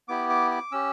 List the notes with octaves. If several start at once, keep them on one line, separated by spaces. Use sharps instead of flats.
B3 E4 G4 D6
D6
D6
C#4 G4 E6